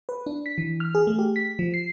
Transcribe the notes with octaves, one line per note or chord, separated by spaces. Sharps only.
B4
D4
B6
E3
F6
G#4
A3
G4
B6
F3
C7